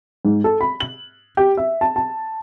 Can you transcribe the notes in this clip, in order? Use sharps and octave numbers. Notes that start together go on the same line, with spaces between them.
G#2
A4
B5
F#7
G4
E5
A5
A5